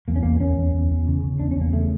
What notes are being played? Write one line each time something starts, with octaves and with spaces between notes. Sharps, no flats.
E2 A#3
C#4
E2 A#3
E2 C#4
E2
E2
E2
C#3
C#3
E2 D4
E2 C#4
A#3
C#3 A3